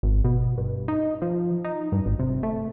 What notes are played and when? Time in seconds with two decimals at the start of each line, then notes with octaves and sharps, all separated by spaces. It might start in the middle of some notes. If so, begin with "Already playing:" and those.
0.03 G#1
0.24 B2
0.58 G2
0.88 D#4
1.22 F3
1.64 D#4
1.92 G2
2.06 G#1
2.19 C3
2.43 A3